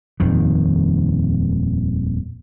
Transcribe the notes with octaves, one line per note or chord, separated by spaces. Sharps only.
D#1 F2 D#3